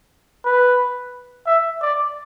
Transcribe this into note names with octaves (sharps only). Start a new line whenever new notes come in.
B4
E5
D5